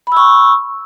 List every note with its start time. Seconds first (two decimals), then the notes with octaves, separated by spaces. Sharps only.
0.07 B5
0.12 E6
0.17 C#6